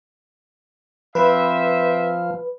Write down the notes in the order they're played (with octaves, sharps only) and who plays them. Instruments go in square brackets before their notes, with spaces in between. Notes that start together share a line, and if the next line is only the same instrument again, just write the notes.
[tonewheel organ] F3 [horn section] C4 E5 [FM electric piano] B4